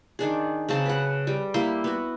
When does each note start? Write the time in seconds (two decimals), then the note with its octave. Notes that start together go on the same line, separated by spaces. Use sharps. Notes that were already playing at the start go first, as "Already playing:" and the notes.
0.19 D#3 D4 G#4
0.69 C#3 F#3 C4 A5
0.86 B4 F#5
1.27 G3
1.54 A#3 E4 G4 C6
1.84 B3 F#4